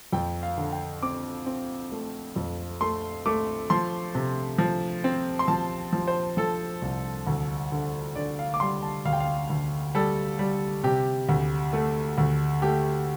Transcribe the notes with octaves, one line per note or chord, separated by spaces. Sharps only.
F2 G5
F5
D3
G5
C4 D6
C4
A3
F2
A3 C6
A3 D6
F3 C6
C3
F3
C4
C6
F3 A5
F3
C5
F3 A4
C2
D2
D3
D3 D5
F5
D6
G3 C6
A5
D2 F5
G5
F5
D2
G3 A4
G3
C3 G4
D2
A3
D2
A3 G4